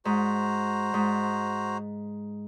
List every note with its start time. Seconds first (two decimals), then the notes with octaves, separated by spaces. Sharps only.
0.05 G#2 F#4 C5 A#5
0.94 G#2